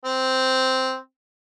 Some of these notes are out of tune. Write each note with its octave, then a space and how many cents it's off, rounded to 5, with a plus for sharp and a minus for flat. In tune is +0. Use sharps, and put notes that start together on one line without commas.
C4 -5